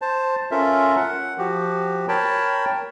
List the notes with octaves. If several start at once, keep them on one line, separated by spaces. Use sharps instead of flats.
C5 A5
C#4 F4 A4 A#4 E5
F#5
F3 F#4 G4
A#4 C#5 G5 A5 B5